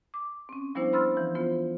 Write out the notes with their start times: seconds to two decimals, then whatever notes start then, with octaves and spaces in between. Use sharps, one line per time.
0.14 D6
0.49 C4 C#4
0.75 F3 G3 B3 D4 E4 C5
0.93 C5 B5 C6 E6 F6 A6
1.17 E3 F3
1.35 B3 F4 C5